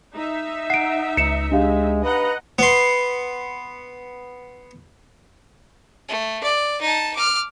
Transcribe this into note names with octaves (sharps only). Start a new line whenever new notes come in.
D#4 E5
F#5 C7 D7
C#2 C#7 E7
G#3 D4 G4 F5
B4 D#5 F#5 A#5
B3 C6
A3
D5
D#4 A5
D6 F6